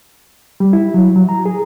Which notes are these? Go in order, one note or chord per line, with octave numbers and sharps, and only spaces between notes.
G3
E4
F#3
F#3
A#5
G#4